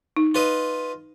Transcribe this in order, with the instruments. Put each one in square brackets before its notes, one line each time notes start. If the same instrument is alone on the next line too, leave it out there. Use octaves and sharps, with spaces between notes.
[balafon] D#4
[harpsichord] F4 B4 D#5